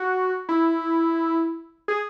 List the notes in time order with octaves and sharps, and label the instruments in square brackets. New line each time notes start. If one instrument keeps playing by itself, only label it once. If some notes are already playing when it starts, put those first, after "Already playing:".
Already playing: [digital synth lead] F#4
E4
G#4